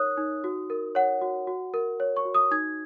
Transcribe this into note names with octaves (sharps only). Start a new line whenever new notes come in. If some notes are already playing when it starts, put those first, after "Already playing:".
Already playing: D#4 A#4 C#5 D#6 F#6
D#4
F#4
A#4
C#5 F#5
F#4
F#4
A#4
C#5
C#6
F#4
D#6
D#4 G#6